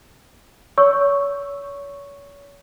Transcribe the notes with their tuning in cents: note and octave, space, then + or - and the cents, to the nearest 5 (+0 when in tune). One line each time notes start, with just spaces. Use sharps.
C#5 +35 C#6 +0 E6 +0